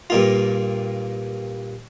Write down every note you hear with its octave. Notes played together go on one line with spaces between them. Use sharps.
G2 A#2 F4